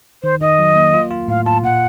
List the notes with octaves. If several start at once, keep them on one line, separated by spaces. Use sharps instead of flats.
D#3 C5
D#3 D#5
F#3
A#3
F4
F4
A2 F5
F4 A5
A#2 F#5